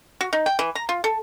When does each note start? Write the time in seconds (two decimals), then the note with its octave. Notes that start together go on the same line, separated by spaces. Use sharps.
0.21 F#4
0.33 D#4
0.46 G5
0.59 E3
0.75 A#5
0.89 F4
1.04 A4